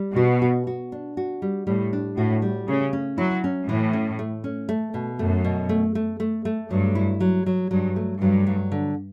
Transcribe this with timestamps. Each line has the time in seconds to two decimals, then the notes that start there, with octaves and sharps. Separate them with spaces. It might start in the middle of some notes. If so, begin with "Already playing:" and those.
Already playing: G3
0.15 B2 F#4
0.42 F#4
0.67 F#4
0.92 D4
1.17 F#4
1.42 G3
1.67 A2 G3
1.93 D4
2.17 A2 F#4
2.42 G3
2.68 C#3 A3
2.93 C#4
3.18 F#3 E4
3.44 C#4
3.68 A2 E3
3.93 C#4
4.19 A3
4.44 C#4
4.69 A3
4.94 B2
5.19 F#2 A3
5.45 B2
5.69 A3
5.95 A3
6.20 A3
6.45 A3
6.71 G2 F#3
6.95 E4
7.20 F#3
7.46 F#3
7.71 G2 F#3
7.96 A3
8.22 G2 F#3
8.47 F#3
8.72 D3